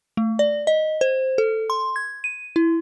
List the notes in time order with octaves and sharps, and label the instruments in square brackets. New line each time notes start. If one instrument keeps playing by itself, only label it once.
[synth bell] A3
D5
D#5
C5
A4
C6
G#6
D#7
E4